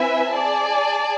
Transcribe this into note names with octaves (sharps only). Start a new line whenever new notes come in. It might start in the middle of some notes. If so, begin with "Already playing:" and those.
Already playing: C4 E4 B4 E5 G#5
G#4 D5 A5